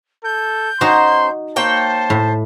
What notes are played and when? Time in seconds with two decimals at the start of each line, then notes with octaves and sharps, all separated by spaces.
0.25 A4 G6
0.81 C#4 D#4 F#4 C5 A#5 C6
1.56 A#3 C5 C#5 G5 A5
2.10 A2